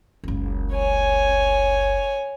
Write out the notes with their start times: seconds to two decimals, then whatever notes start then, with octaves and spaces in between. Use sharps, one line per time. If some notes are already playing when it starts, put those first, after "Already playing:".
0.24 F#1 C#2
0.72 C#5 G#5